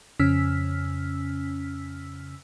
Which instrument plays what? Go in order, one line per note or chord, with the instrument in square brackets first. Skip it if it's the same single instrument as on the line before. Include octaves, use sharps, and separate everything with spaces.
[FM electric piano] F2 C#3 C#4 E6 F6 B6